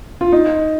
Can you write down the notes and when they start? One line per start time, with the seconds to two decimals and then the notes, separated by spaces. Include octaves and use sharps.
0.21 F4
0.32 D#4